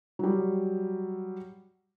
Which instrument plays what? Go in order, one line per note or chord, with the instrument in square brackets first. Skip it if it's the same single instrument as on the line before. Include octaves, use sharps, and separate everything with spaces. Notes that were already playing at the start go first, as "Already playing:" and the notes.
[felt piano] F#3 G3